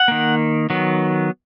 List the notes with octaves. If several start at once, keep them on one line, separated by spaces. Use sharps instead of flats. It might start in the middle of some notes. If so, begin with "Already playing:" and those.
Already playing: F#5
D#3 A#3
D#3 F#3 B3